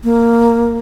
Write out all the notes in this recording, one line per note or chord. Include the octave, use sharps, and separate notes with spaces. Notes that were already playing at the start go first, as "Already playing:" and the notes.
A#3